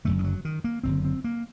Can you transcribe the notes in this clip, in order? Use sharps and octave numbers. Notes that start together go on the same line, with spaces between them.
F#1 F#2 D3 A3
D#3
F#3
D#3
A#3
F#1 F#2 D3 C4
C4
A#3